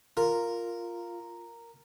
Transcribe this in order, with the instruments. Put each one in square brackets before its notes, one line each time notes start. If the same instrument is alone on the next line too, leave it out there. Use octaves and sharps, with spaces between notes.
[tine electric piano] F4 [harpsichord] A#4